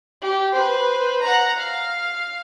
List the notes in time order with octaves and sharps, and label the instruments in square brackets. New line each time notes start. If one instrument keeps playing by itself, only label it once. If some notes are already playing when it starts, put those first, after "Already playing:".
[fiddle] G4
B4 C5
F#5 A#5
F5